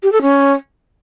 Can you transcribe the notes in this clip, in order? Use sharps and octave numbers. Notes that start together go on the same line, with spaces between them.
G4
A4
C#4